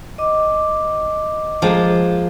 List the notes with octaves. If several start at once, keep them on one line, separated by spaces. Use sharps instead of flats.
D#5 D6
F3 G#3 A#3